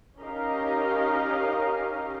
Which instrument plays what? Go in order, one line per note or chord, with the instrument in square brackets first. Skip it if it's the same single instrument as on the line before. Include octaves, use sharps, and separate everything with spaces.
[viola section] C#4 D#4 G4 A#4 D#5 F5